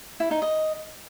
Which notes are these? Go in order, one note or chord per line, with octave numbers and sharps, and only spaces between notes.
E4
D#4
D#5